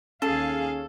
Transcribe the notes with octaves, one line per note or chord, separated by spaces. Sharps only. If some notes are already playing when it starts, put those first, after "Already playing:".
D#2 C#4 G#4 A4 F5